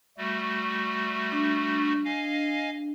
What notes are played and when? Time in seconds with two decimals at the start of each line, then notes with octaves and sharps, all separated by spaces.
0.18 G3 A3 F#4
1.32 D4
2.05 D#5 F5 G#5